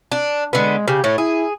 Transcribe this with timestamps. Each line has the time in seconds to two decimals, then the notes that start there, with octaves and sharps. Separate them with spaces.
0.12 D4
0.53 D3 G#3 B3
0.88 C#3 G4
1.04 A2 A3 C#5
1.18 E4 G#4